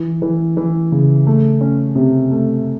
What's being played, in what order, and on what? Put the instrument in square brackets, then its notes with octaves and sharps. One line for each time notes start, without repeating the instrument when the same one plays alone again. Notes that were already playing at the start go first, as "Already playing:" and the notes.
Already playing: [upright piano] E3
E3
E3
C#3
A3
C#4
C3
A3